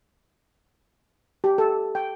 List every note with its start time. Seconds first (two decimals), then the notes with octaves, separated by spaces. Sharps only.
1.44 G4
1.58 A4
1.95 G5